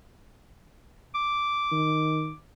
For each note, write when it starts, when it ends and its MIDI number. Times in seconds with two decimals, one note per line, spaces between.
1.15 2.37 86
1.72 2.32 51